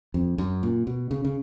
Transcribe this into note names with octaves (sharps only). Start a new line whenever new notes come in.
F2
F#2
A#2
B2
C#3
C#3